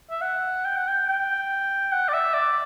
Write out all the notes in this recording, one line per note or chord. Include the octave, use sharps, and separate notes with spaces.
E5
F#5
G5
F#5
G5
G5
F#5
D5
E5
D5